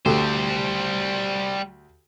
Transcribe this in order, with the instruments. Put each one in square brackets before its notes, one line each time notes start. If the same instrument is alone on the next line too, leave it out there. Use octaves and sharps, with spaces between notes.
[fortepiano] D2 G4 A4 [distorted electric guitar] G3 C5